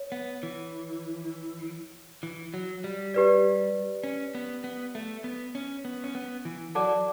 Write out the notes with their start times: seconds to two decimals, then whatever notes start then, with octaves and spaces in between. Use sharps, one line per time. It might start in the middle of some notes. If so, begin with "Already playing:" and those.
Already playing: C#5
0.12 B3
0.43 E3
2.23 E3
2.54 F#3
2.84 G3
3.14 G4 B4 D5
4.04 C#4
4.35 B3
4.64 B3
4.95 A3
5.24 B3
5.55 C#4
5.85 B3
6.04 C#4
6.15 B3
6.45 E3
6.75 F#3 A4 D5 F#5 A5 D6